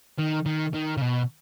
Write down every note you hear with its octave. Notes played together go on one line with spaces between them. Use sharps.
D#3
D#3
D#3
C#3
B2